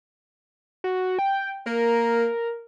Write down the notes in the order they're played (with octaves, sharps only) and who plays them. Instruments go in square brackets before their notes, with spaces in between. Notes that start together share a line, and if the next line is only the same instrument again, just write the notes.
[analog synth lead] F#4
G5
[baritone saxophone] A#3 [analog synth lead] A#4